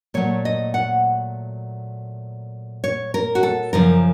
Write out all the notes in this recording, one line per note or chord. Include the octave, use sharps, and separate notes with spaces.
A#2 F#3 A3 C#5
D#5
F#5
C#5
A#4
F#4
A4
F#2 C#3 F3 A#4